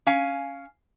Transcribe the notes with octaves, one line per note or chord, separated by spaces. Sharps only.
C#4 F5 G#5